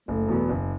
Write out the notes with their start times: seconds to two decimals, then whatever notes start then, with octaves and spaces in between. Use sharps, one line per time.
0.08 F#1 A3
0.29 E2 B2 F#3 B3
0.49 F#1